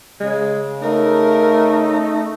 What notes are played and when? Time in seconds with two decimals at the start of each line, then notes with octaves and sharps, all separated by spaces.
0.20 C#3 G#3
0.82 A3 D#4 A#4